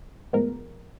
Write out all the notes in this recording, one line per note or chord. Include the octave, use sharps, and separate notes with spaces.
A2 F3 G#3 B3 A#4